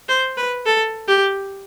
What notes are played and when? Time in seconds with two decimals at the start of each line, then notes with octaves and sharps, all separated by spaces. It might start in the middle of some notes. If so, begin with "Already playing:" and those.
0.09 C5
0.37 B4
0.66 A4
1.08 G4